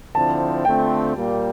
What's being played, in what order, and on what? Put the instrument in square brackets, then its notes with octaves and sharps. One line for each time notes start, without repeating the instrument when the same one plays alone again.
[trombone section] D3 F3 C4 E4 [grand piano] A5
[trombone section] D3 A3 C4 F4 [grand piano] G5
[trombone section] A#2 G3 A#3